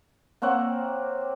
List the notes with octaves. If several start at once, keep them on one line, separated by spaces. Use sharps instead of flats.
A#3 C4 C#5 F#5